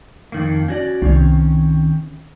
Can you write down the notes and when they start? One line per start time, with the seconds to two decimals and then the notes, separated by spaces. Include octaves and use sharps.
0.32 F2 D#3 A#3
0.68 C#4 F#4 D5
1.02 C2 D#3 C4 C#4